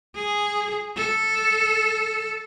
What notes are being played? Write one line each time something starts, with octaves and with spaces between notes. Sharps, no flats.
G#4
A4